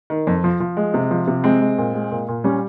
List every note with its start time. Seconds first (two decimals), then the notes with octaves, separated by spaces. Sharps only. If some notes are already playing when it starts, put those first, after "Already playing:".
0.10 D#3
0.27 F2
0.44 F3
0.60 F3
0.77 G#3
0.94 C3
1.11 F3
1.27 C3
1.44 G#3 C4
1.61 G#3
1.78 A#2
1.94 G#3
2.11 A#2
2.28 A#2
2.44 G3 C#4